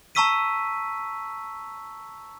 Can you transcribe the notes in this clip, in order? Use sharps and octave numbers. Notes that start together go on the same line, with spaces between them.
A5 A#5 C#6 E6 B6 D#7